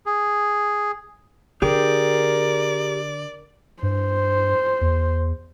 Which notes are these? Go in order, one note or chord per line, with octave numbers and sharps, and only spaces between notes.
G#4
D3 G4 G#4 A#4 D5 G5
G2 C5
E2